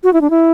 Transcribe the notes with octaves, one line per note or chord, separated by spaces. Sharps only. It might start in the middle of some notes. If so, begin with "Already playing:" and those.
F#4
E4
D4
E4